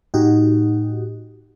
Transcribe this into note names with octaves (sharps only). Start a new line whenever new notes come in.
A2 D#4 F#4 G4